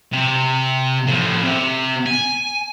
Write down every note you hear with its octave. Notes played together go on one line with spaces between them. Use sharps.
C3
A2 F3
C3
G#5